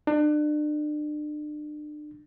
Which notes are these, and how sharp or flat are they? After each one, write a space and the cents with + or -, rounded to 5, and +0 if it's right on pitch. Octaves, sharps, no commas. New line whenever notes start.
D4 +35